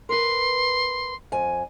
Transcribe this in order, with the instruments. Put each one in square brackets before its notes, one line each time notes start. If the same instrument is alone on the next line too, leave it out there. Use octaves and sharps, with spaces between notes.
[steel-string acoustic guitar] A#4 B4 [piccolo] C6
[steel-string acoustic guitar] F2 G#5